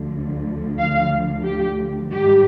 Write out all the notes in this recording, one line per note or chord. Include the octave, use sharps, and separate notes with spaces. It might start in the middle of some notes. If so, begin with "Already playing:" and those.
Already playing: D2 D3 F3
F5
G4
G#2 D#3 G3 G4